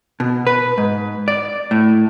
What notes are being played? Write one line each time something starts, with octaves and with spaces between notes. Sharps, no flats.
B2
B4
G#2
D5
A2